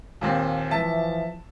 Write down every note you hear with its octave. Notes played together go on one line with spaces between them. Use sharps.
D#2 A#2 C4
E3 F3 E5 A5